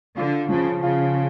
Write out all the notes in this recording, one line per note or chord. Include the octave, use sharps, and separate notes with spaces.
D3 F4
C#3 F3
C#3 F4